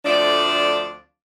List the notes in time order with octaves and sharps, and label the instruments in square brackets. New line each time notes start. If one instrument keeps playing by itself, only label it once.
[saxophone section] D2 F3 A3 C4 D4 D5